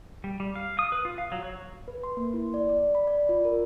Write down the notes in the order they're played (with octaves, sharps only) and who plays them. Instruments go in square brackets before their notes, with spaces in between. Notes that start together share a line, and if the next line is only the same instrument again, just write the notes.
[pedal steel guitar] G3
G3
F5
D#6
B4
F4
F5
F#3
C#5
[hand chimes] B4
C6
A#3
E4
D5
D5
B5
D5
F4
A#4